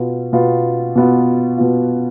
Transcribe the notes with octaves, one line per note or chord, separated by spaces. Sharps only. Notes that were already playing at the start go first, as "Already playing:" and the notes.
Already playing: B2 B3 F4
B2 B3 F4
B2 B3 F4
B2 B3 F4